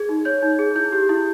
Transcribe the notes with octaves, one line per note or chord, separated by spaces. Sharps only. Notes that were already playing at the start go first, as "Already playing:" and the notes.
Already playing: G#4 G#6
D#4
C#5 G6
D#4
G#4
E4 G6
G4
E4